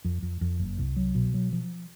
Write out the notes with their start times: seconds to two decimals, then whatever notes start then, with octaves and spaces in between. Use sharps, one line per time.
0.05 F2
0.22 F2
0.41 F2
0.60 F#1
0.78 C2
0.97 F#3
1.15 B2
1.34 F#3
1.53 F3